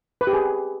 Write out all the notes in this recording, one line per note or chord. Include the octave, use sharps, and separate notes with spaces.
B4
G4
G#4